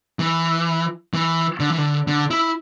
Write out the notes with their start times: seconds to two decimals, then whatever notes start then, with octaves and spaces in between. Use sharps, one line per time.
0.19 E3
1.14 E3
1.60 D3
1.70 E3
1.78 D3
2.07 D3
2.31 E4